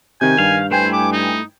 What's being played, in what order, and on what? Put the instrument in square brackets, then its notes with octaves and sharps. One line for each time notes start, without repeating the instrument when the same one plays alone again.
[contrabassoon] C3 [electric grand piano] D#3 G6 [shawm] G#5
[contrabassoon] G2 [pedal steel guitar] F5
[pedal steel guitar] A3 E4 [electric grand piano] B4 G5 G#5 [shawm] C5
[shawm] D6
D#4